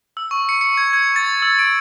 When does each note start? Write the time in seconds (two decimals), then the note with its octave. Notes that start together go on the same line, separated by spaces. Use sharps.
0.17 E6
0.31 C#6
0.49 C#7
0.61 C#7
0.77 G#6
0.93 G#6
1.16 A6
1.42 E6
1.59 D7